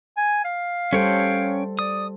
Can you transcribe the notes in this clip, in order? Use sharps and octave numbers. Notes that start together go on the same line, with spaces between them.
G#5
F5
G3 C#4 A4 C5 C#5 G5
D5 D#6